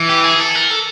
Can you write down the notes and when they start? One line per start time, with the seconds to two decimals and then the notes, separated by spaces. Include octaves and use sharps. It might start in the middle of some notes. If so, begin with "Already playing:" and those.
Already playing: E3
0.09 G4
0.24 G#4
0.40 A4
0.55 A#4
0.70 A4